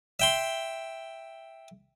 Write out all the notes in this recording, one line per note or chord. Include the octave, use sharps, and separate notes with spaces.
E5 G5 C6